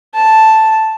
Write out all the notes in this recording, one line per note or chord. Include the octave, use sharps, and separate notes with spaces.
A5